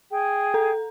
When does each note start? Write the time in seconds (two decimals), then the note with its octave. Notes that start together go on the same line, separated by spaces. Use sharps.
0.10 G#4 G5
0.54 A4 A#5